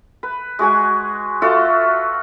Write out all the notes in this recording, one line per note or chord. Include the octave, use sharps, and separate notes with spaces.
B4
G#3 F#4 G#4 G#5
F4 F#4 A4 E5